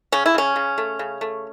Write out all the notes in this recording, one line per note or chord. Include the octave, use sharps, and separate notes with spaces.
C#3 C#4
E4
C#3 C#4
C#3
A3
C#3
A3